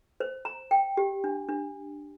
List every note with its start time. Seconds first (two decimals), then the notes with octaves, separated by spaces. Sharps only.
0.20 C5
0.45 A#5
0.71 G5
0.97 G4
1.24 D4
1.49 D4